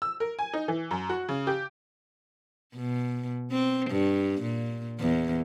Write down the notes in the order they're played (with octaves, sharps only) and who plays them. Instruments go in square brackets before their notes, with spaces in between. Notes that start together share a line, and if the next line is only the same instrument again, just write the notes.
[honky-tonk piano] E6
A#4
G#5
D#4
E3
F#2
F#4
C#3
G4
[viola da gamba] B2
C4
G2
A#2
E2